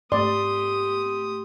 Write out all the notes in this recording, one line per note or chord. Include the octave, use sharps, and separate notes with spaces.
G#2 A3 G4 D5 C6 D#6